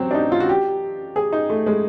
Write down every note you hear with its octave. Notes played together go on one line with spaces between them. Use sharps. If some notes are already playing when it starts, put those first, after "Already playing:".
Already playing: F#3 C4
D4
D#4
F4
F#4
G4
G#4
D#4
A3
G#3